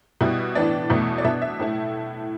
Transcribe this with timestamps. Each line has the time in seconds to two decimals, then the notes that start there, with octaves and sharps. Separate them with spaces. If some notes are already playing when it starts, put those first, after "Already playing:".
0.21 B2 G3 E4
0.55 A2 E3 B3 D4 D5
0.90 E2 B2 A3 E4
1.18 D5
1.24 B2 B3 D4 E5
1.42 E5
1.60 A2 A3 E4